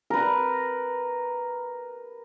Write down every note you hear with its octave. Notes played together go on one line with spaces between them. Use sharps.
A#4 B4